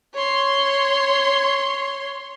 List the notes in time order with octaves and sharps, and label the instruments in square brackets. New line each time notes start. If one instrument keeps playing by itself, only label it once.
[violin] C#5 C6